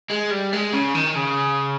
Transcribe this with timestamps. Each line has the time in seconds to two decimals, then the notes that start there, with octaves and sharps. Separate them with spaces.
0.10 G#3
0.31 G3
0.53 G#3
0.73 C#3
0.95 D#3
1.15 C#3